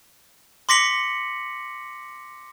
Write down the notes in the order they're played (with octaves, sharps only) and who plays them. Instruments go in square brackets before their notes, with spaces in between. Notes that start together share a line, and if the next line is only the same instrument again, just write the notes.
[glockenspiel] C6 D6 A#6 B6 C#7 F#7